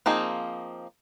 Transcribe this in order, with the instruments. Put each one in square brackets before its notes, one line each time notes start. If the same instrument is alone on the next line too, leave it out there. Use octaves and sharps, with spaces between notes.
[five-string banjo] F3 A#3 C4 D#4 G#4